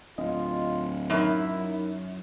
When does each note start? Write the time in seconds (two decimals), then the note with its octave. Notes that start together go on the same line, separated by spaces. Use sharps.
0.18 D1 F4 D#5
1.10 F#2 D#4 E4 A#4